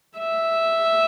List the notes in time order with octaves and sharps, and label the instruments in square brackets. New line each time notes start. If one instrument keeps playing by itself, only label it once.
[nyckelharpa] E5